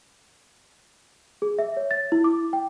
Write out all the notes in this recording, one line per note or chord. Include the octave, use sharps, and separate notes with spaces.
G#4
E5
C#5
A6
E4
D6
G5